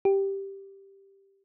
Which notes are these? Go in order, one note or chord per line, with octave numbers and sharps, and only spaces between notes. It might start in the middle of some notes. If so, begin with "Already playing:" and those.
G4